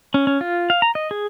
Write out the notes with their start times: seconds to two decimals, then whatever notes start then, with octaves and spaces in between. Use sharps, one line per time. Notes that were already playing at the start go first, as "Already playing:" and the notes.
0.14 C#4
0.27 C#4
0.41 F4
0.70 F5
0.82 A#5
0.95 D#5
1.11 G#4